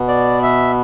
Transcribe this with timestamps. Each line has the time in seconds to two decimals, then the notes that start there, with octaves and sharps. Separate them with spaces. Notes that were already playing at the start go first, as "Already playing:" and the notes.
Already playing: B2 B3
0.08 D5
0.43 E5